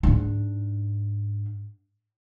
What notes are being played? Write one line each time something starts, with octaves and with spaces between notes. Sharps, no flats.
G#2 D4